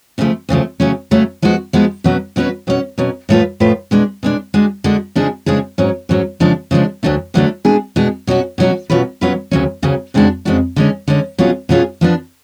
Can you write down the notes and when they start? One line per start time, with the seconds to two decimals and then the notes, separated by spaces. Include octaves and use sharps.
0.18 D2 C#3 F3 A3
0.49 D2 C#3 F3 A3
0.80 C#3 F#3 A3 C#4
1.11 C#3 F#3 A3 C#4
1.42 F3 G#3 B3 F#4
1.73 F3 G#3 B3 F#4
2.04 B2 F#3 C#4 F#4 B4
2.36 B2 F#3 C#4 F#4 B4
2.67 B2 F#3 C#4
2.98 B2 F#3 C#4
3.29 A2 F3 A3 F4 B4
3.60 A2 F3 A3 F4 B4
3.91 B2 G#3 D4
4.23 B2 G#3 D4
4.54 D3 G#3 D4 F#4
4.84 D3 G#3 D4 F#4
5.15 C#3 F3 G#3 D4 G#4
5.46 C#3 F3 G#3 D4 G#4
5.78 G#2 F#3 C#4
6.09 G#2 F#3 C#4
6.40 C#3 F3 G#3 D4
6.71 C#3 F3 G#3 D4
7.03 D2 D3 F#3 A3 D4
7.34 D2 D3 F#3 A3 D4
7.65 B2 G#3 D4 G#4
7.96 B2 G#3 D4 G#4
8.27 B2 F#3 C#4 F#4
8.58 B2 F#3 C#4 F#4
8.90 B2 F#3 C#4 F4 B4
9.21 B2 F#3 C#4 F4 B4
9.51 D2 C#3 F#3 C#4
9.82 D2 C#3 F#3 C#4
10.14 F2 C#3 G#3 D4 F#4
10.45 F2 C#3 G#3 D4 F#4
10.76 D3 G#3 C#4
11.08 D3 G#3 C#4
11.38 B2 F#3 C#4 F4 G#4
11.69 B2 F#3 C#4 F4 G#4
12.01 F3 B3 D4